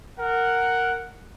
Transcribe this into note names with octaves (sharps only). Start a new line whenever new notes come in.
A#4 F#5